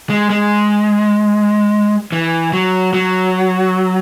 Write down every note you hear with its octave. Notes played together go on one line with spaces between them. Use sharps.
G#3
G#3
E3
F#3
F#3